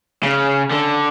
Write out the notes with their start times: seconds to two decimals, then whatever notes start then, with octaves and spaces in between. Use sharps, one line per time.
0.23 C#3
0.71 D3